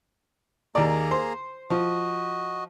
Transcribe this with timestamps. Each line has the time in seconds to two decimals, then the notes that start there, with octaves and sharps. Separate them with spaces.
0.75 D#2 A#3 G#4 D5 A#5
1.11 C5
1.70 F3 F#4 D#5